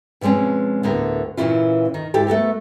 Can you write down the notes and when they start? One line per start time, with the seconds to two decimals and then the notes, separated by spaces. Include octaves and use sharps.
0.21 B2 F3 G#3 C4 C#4
0.83 D2 A2 D3 B3 G4 A#4
1.37 A#2 C#3 E3 C#4 E4 F4
1.94 D#3
2.14 G#2 E4 G4 A4
2.27 A3 B3 A4 A#4